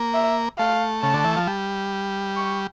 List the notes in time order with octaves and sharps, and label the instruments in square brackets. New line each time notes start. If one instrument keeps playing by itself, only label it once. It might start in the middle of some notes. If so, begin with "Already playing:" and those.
Already playing: [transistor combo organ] A#3
[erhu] E5
[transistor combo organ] A3 [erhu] F5
[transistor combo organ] C#3 [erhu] A5
[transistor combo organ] D3
E3
F3
G3
[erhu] C#6